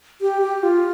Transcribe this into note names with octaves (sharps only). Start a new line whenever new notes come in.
G4
G4
F4